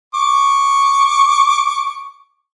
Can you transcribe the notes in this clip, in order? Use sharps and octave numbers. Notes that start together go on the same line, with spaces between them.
C#6 D6